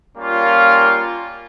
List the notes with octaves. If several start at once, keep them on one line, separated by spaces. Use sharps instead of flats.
G3 A#3 C#4 F4